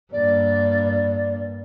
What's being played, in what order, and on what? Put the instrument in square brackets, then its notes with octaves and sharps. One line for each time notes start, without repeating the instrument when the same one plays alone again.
[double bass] G2 A#3 [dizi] D5